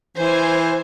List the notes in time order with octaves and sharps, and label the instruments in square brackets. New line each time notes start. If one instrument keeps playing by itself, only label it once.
[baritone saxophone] E3 [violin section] C5 G#5